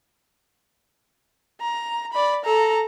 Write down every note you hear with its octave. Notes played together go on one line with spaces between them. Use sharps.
A#5
D5 B5
A4 A#5